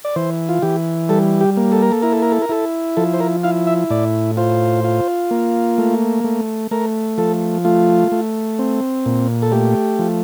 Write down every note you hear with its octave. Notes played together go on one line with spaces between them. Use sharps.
D5
E3 C5
F4
E3 G4
G3 A4
G4
A#3
A4
A#4
A4
E4 A#4
A4
A#4
A4
A#4
E4 A4
F3 A4
C5
A#4
E4 F5
E5
A2 D5
F4 C5
F4
A#3
A3
A3
A3 A#4
F3 A4
A3 F4
A3
C4
A#2
A4
A3 G4
F3